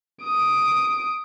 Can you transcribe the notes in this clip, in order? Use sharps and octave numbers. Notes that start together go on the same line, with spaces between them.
D#6 D7